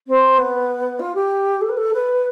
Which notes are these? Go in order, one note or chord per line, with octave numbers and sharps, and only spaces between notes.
C4
B3
F4
G4
A4
B4
A4
B4